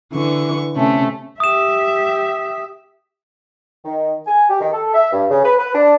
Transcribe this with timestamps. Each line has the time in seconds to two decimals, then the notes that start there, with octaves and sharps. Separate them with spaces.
0.12 D3 E3 C#6
0.76 C3 A3 C#4
1.40 G4 E5 D#6 E7
3.85 D#3
4.27 G#5
4.49 G4
4.61 D#3
4.72 A4
4.94 E5
5.12 G2
5.30 C#3
5.44 B4
5.58 B4
5.74 D4